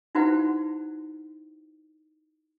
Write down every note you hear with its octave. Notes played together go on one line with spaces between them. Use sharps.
D#4 E4 F#4 B4 C5 F#5